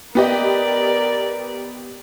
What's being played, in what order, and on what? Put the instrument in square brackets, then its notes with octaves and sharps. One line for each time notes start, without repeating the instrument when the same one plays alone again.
[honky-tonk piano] B3 G4 D#5 [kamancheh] A#4 D5